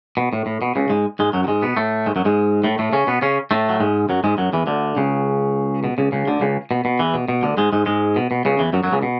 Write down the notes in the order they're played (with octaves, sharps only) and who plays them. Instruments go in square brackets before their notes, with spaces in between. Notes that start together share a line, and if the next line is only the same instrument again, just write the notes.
[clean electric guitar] B2
A2
A2
B2
C#2 C#3
G#2 G#3
G#2 G#3
F#2 F#3
F#3
G#2 G#3
B2 B3
A2 A3
G#2 G#3
F#2 F#3
G#2 G#3
A2 A3
A2 A3
C#3 C#4
B2 B3
C#3 C#4
A2 A3
F#3
G#2 G#3
F#2 F#3
G#2 G#3
F#2 F#3
E2 E3
D2 D3
C#2 C#3
B2
C#2 C#3
C#2 C#3
D2 D3
C#2 C#3
B2
B2
E2 E3
B2
B2
D2 D3
G#2 G#3
G#2 G#3
G#2 G#3
B2
B2
C#2 C#3
E2 E3
F#2 F#3
F#2 F#3
C#2 C#3
B2